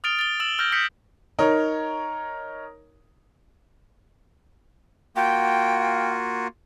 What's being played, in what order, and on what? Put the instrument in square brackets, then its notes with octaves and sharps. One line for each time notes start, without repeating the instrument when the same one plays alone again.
[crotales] D#6 F6 A6 D7 F7 G7
A6 F7 G7
E6 E7 F#7
E6 F6 G6 A#6
D#6 G6 A#6 B6 C#7
[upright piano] D#4 A#4 C#5
[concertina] A#3 F4 F#4 [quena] G5